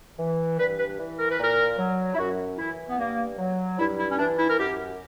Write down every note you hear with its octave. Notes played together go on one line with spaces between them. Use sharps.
E3
G2 B4
B4
E3
A#4
B4
A#2 A#4
F#3
E4
F#2 F#4
E3 E4
B3
G2 A#3
F#3
G2 E4
E4
C#4
E3 D4
E4
A#4
F#2 G4